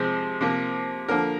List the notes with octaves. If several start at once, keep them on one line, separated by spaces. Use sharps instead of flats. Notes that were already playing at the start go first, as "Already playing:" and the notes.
Already playing: C3 F3 G#3 C5
C3 F3 A#3
D3 F3 A#3 A#4